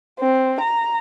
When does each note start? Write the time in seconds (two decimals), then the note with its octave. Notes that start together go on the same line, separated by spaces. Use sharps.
0.20 C4
0.60 A#5